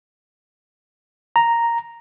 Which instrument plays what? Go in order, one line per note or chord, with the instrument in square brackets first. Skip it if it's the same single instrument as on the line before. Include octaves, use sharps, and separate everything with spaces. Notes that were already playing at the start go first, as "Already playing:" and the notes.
[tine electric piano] A#5